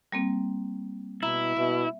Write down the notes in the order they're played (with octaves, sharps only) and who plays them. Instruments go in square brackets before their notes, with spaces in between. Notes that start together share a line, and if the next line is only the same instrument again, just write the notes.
[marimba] G3 A#3 C4
[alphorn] B2 [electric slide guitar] E4 [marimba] A#5
[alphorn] B2 [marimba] E5